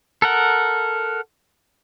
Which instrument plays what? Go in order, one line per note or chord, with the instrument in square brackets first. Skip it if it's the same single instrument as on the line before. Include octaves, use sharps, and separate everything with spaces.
[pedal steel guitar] A4 A#4 F#5